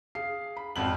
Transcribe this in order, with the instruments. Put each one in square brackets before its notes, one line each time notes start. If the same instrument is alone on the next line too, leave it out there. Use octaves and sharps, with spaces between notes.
[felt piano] G#4 F5 C7
B5
[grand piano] G#1 F2 F#7 [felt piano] F#5 B5